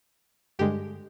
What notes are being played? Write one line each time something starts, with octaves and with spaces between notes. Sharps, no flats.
G2 D3 G#3 G4